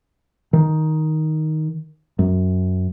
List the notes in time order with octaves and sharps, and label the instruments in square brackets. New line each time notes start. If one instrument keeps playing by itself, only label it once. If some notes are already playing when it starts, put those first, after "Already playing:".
[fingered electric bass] D#3
F#2